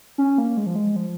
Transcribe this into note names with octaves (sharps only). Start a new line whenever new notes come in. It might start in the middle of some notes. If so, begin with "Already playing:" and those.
C#4
A#3
G#3
F3
G#3
F3